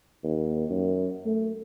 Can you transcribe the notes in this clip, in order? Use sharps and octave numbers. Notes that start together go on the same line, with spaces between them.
D#2
F#2
A3